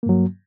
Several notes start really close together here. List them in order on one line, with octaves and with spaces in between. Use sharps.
A#3 G2 F#3